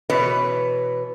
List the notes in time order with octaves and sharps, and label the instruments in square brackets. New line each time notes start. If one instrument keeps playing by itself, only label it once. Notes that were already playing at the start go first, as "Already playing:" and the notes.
[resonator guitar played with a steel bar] B2 E3 B4 C#5